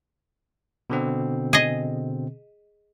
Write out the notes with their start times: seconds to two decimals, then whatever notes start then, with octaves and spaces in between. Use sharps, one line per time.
0.90 B2 D3 C4
1.53 G#4 D#5